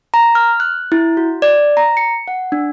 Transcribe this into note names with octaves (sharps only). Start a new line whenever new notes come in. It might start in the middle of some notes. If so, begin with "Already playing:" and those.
A#5
F6
F#6
E4
F#4
D5
A#5
C#7
F#5
D4